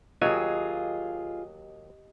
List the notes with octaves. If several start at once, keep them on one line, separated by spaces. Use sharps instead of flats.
D#2 F#3 F4 G4 G#4 D#5 G#5